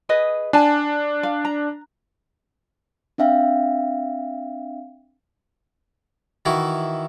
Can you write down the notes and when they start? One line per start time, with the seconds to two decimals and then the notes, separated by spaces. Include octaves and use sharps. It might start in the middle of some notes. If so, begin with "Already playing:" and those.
0.09 G#4 B4 D#5
0.53 D4 G#5 A5
1.23 F5
1.45 A#5
3.18 C4 D4 E5 F5 G5
6.45 D#3 E3 E4 F#4